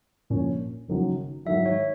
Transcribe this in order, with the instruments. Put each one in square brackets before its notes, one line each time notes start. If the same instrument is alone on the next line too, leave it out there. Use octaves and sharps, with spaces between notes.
[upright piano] A#1 A#2 A#3 C#4
F#1 F#2 D#3 F#3
[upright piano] G#2 D#3 F#3 [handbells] E5
[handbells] C#5